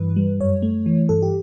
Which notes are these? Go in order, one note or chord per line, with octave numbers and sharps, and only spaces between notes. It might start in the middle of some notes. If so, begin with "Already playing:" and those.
Already playing: G2 E3 B4
G3
F#2 C#5
A3
E3
G2 A4
G4